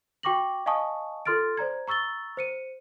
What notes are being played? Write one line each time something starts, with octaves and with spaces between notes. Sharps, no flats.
F#4 G5 C#6 D6 A#6 F#7
D#5 F5 G#5 A5 C#6 D#6
F4 A4 C6 F6 A6 D7
C5 D5 A#5 G#6
A#5 C#6 E6 A6 G7
C5 C#7 D#7